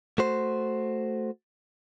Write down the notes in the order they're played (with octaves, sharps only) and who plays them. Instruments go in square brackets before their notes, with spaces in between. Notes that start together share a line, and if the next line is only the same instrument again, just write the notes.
[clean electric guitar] A3 F#4 C5